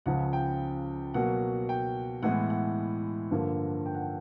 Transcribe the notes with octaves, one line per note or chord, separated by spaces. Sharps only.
C#2 C#3 F3 F#5
G5
B2 F#3 A#3 F#5
G5
A2 E3 G#3 B3 F#5
F#5
G2 D3 F3 A#3
G5
F#5
G5